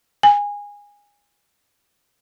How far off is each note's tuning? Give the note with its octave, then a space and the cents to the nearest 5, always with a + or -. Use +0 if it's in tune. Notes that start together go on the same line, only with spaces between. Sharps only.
G#5 -20